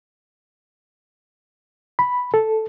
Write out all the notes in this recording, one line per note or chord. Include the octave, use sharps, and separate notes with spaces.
B5
A4